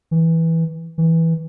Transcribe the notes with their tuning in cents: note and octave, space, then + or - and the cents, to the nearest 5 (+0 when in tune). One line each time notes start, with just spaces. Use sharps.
E3 -10
E3 -10